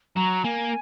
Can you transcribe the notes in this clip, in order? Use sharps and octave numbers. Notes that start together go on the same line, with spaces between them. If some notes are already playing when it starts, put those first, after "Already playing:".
F#3 A#5
A#3 G#5